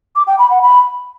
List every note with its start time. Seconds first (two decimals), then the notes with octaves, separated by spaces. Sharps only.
0.16 D6
0.27 G5
0.39 B5
0.50 F#5
0.62 B5